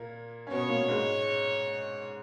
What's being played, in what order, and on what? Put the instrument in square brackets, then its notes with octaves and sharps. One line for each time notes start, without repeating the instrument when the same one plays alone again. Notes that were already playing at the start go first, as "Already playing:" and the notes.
Already playing: [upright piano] A#2 A#3
C#4
[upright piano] B2 B3 [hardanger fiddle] C#5
[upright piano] A#2 A#3
G#2 G#3